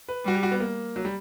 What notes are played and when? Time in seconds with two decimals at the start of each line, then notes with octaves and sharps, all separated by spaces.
0.09 B4
0.25 G3 F#4
0.35 G4
0.43 F#4
0.51 B3
0.60 A#3
0.96 F#3
1.05 G3